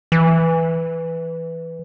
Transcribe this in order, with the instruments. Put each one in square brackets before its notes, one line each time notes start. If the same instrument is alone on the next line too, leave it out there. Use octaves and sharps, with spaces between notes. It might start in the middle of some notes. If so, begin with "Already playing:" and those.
[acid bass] E3